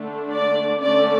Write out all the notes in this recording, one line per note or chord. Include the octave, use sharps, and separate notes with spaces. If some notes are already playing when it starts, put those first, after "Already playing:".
Already playing: D3 A3 D4
D5
D3 A3 C#4 D5